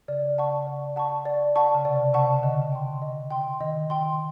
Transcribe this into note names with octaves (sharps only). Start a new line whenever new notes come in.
C#3 D5
C#3 F#5 A5 C#6
D5
F#5 A5 C#6
D5
F#5 A5 C#6
C#3
C3 D5
C3 F#5 A5 C#6
C#3
D3 D#5
G5 C6
D#5
G5 C6
D#3 D#5
G5 C6